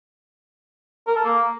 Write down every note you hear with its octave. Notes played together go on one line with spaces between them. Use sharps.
A#4
A4
A#3